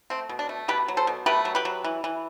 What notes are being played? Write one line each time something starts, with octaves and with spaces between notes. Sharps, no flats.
A3 C4
B2
D4
A3
B2 G4 B4
F#3
A4 C5
B2
A3 G4 B4
F#3
G4 B4
F#3
E3
E3